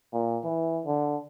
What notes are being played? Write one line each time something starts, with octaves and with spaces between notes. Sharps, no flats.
A#2
E3
D3